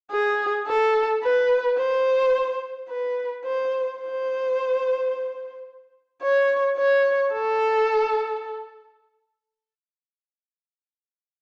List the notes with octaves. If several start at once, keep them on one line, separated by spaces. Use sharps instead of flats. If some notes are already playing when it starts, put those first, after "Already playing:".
G#4
A4
B4
C5
B4
C5
C5
C#5
C#5
A4